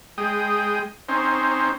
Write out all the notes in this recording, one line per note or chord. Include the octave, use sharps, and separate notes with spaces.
G#3 G5 D#6
C4 C#4 D#4 C5